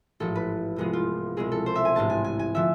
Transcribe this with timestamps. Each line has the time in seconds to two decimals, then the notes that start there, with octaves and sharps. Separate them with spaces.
0.20 A1 G#2 F3 A4
0.36 B4
0.76 C2 C3 F3 G#3 B3 G#4
0.93 F4
1.37 C2 B2 G#3 C4 G#4
1.52 A4
1.66 C5
1.75 E5
1.85 G#5
1.95 A1 G#2 G#3 D4 A5
2.10 G#5
2.24 G#5
2.39 G#5
2.55 D3 F3 E5